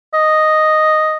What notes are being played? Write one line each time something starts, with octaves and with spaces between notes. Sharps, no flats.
D#5